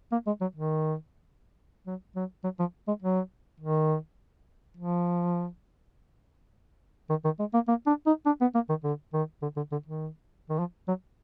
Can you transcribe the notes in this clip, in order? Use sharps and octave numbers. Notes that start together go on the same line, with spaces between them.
A#3
G#3
F#3
D#3
F#3
F#3
F#3
F3
G#3
F#3
D#3
F3
D#3
D#3
G#3
A#3
A#3
D4
D#4
D4
B3
A#3
D#3
D3
D#3
D3
D3
D3
D#3
D#3
F3
F#3